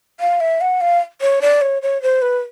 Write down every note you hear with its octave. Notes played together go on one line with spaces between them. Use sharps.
F5
E5
F#5
F5
C#5
D5
C#5
C#5
C5
B4